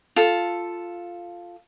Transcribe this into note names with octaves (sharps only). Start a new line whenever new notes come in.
F4 A4